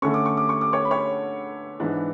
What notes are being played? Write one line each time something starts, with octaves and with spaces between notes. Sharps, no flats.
D3 A3 C#4 C#6
D6
C#6
D6
C#6
D6
C#5 C#6
B5
C#5 C#6
G#2 E3 B3 D4